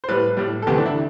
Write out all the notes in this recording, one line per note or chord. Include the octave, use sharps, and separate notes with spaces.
C5
A2 G3 B4
A2 G3
A4
D2 C3 E3 A3 G4
D4
E4